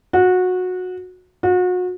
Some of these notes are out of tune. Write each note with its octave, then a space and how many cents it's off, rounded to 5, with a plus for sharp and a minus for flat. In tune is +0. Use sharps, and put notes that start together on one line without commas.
F#4 -20
F#4 -35